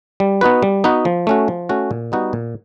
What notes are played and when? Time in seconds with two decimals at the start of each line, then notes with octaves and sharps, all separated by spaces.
0.20 G3
0.41 B3 D#4 F#4 B4
0.62 G3
0.84 B3 D#4 F#4 B4
1.05 F3
1.27 A3 C#4 F#4
1.48 F3
1.69 A3 C#4 F#4
1.91 A#2
2.12 G3 B3 D#4 F#4
2.33 A#2